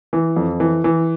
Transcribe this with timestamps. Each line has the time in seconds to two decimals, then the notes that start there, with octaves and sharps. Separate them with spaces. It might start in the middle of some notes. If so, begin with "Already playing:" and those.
0.13 E3
0.36 F2
0.60 E3
0.84 E3